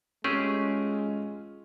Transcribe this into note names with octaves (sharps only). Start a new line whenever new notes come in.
G#3 A3 C#4 F4 G4 G#4 C#6 F#6